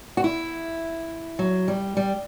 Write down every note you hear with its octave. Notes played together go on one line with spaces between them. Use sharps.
F#4
E4
F#3
G3
G3